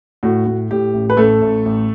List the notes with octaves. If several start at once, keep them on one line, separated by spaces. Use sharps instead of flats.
A2 F#4
A2
A2 G4
A1
B4
A1 A3 A4
A1
A1